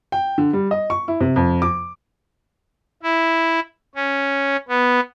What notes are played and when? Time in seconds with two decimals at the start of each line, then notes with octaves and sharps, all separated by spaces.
0.12 G5
0.38 D3
0.53 G3
0.71 D#5
0.90 C#6
1.08 E4
1.21 C3
1.36 F2
1.62 D6
3.03 E4
3.95 C#4
4.68 B3